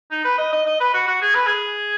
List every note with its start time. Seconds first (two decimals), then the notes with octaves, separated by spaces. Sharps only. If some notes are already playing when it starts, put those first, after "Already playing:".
0.11 D#4
0.25 B4
0.38 D#5
0.52 D#5
0.66 D#5
0.80 B4
0.94 F#4
1.08 F#4
1.22 G#4
1.34 B4
1.47 G#4